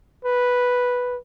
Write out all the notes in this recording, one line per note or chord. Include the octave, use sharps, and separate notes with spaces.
B4